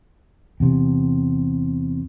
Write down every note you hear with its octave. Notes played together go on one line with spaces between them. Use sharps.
E2 C3